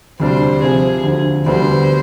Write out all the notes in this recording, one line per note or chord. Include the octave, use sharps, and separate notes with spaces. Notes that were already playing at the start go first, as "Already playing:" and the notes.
D2 C3 G3 D4 C5
C3 F3 C4 G#4
D2 D3 F3
D2 D3 G3 B3 D4 C5